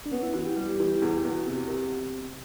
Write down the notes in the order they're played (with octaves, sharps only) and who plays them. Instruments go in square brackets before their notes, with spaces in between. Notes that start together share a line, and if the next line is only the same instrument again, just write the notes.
[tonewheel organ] D4
[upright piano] B3 [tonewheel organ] C#4
[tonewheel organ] E4
[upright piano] E3 [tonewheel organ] F#4
[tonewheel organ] G4
[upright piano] G3
E3
[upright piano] E2 [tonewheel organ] G#4
[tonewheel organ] G4
[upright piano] E2
[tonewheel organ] F#4
[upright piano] C3
[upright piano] C3 [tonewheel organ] A#4